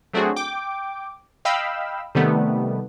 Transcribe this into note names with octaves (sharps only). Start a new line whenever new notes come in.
F#3 A3 C4 D4 F#4 G#4
G5 D6
D#5 F5 G5 B5 E6
C3 D#3 G3 A3 B3